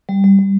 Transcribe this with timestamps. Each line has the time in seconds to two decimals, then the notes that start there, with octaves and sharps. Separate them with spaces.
0.09 G3
0.24 G3
0.39 G3